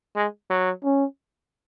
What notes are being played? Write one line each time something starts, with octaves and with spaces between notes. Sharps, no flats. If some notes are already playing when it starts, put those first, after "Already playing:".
G#3
F#3
C#4